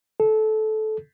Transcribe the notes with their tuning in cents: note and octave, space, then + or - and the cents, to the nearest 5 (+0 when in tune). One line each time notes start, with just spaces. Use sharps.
A4 -20